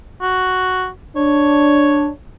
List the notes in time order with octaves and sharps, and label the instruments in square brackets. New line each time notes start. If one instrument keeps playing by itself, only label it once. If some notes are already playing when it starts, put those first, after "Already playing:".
[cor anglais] F#4
[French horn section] D4 [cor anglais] C#5